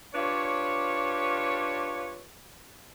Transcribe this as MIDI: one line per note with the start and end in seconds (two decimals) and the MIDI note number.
0.15 2.22 62
0.15 2.22 65
0.15 2.22 67
0.15 2.22 71
0.15 2.22 73